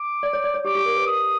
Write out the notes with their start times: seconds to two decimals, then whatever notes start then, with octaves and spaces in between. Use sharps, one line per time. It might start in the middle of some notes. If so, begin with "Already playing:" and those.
Already playing: D6
0.23 D5
0.33 C#5
0.44 D5
0.54 C#5
0.65 G4 D6
0.75 G4
0.85 A#4
0.97 B4
1.07 D#6